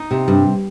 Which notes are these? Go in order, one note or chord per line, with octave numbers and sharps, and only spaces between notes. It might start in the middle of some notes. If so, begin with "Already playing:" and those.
Already playing: D#4
C3
G2